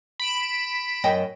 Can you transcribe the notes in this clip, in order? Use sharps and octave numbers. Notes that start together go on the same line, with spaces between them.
B5 D7 E7
F#2 D#5 G5